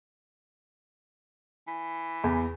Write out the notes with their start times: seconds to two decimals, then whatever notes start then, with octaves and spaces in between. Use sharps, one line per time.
1.68 E3
2.24 E2